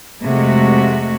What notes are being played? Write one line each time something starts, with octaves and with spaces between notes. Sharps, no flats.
F2 C3 G#3 A3 F#4